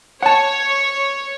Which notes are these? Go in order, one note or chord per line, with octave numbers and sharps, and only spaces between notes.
C#5 F#5 A5